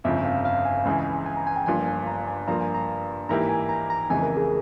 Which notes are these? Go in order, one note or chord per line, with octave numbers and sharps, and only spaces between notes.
G1 F2 C#3 F3 E5
F5
F5
G#5
C#2 C#3 E3 G#3 E4
G#5
A#5
G#5
G5
G1 G2 F3 A#3 F4 G#5
G#5
A#5
G#5
G2 F3 A#3 F4 A#5
G#5
A#5
G#2 E3 A#3 E4 G4 A#5
G#5
A#5
A#5
F1 F2 C#3 E3 G#3 G#5
A#4
G#4